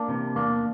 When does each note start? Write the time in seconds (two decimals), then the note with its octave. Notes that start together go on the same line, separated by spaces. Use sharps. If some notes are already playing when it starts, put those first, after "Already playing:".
Already playing: A#3 D4
0.08 C3 E3
0.36 E2 A#3 D4